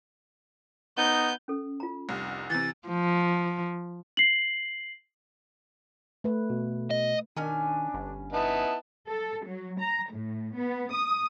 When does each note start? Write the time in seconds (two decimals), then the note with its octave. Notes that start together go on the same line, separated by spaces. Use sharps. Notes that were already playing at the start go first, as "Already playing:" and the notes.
0.98 B3 D#4 G6
1.48 C#4 A4
1.80 F4 A#5
2.09 F1 C2
2.50 C3 E3 A6
2.88 F3
4.17 C7 F#7
6.24 A3 B4
6.50 B2
6.91 D#5
7.37 B2 D#3 C#4 D4 G#5
7.94 G1
8.33 B3 D#4 E4 A5
9.08 A4
9.46 F#3
9.80 A#5
10.12 A2
10.56 B3
10.92 D#6